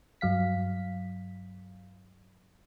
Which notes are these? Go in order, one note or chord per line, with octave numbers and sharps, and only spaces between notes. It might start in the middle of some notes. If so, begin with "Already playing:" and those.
G2 F#3 F5 B6